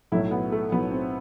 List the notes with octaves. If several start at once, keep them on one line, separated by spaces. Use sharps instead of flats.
B1 A2 F#3 E4
B3
A3
B1 A2 F#3 B3
C4